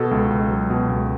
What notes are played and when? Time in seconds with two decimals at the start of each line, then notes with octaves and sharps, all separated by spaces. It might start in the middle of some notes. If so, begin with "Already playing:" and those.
Already playing: B2 A4
0.11 C#2
0.30 C#2
0.50 F#3
0.70 B2
0.90 C#2